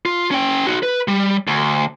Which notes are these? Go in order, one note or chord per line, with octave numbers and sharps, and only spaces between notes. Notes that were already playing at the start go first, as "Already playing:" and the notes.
F4
C#4 G5
D#4 F#4
B4
G3
D2